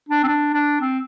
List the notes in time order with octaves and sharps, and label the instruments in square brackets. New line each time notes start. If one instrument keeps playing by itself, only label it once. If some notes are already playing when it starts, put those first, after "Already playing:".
[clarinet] D4
C4
D4
D4
C4